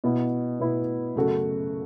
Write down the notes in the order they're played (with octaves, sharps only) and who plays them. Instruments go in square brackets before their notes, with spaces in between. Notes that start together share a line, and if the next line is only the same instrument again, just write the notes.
[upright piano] B2 B3 E4
B2 B3 E4
F#2 C#3 A3 F#4 A4